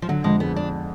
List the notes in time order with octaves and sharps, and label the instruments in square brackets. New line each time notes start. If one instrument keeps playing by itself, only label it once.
[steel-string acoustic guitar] F3
[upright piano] D3 [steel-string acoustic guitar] F#3
[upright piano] F2 [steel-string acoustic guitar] G#3
[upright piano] G#3 [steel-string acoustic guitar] B3
[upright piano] G#3 [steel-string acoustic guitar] D4